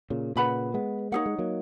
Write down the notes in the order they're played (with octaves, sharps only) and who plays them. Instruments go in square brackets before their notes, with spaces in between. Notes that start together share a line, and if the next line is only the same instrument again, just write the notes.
[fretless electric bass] A#2 C#3
[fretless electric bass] A#2 C#3 [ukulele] B4 F#5 B5
[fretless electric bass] G#3 B3
[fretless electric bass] A#3 [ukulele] D#4 G#4 C#5 F#5
[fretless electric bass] G#3
F#3 A#3